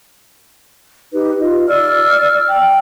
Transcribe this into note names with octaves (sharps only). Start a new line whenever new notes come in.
D#4 G4 B4
F4 D#5
D5 E6 F6
G5